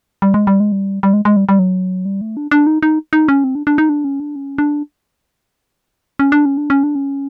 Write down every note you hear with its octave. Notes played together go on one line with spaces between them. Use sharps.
G3
G#3
G3
G#3
G3
G3
G#3
G#3
G3
G3
F#3
G3
A3
D4
D4
D#4
D#4
D#4
C#4
C4
D4
D4
D#4
D4
C#4
D4
C#4
D4
C#4
D4
C#4
D4
C#4
D4
C#4